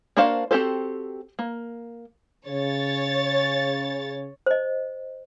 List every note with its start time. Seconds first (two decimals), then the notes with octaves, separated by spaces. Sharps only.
0.17 A#3 D4 F#4 C5 F5
0.51 C4 F#4 G4 A4 C5
1.39 A#3
2.46 C#3 C#5 A6
4.46 C5 D#5